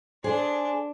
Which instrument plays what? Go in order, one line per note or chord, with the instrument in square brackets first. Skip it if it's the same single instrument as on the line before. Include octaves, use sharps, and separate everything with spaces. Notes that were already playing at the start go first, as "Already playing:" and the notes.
[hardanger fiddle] D4 [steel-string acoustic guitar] G#4 C5